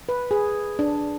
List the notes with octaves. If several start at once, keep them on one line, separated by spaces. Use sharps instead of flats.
B4
G#4
D4